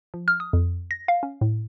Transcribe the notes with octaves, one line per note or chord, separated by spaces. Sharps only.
F3
F6
D#6
F2
A#6
F5
C#4
A2